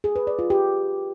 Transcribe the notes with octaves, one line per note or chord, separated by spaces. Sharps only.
G#4
B4
D5
F4
G4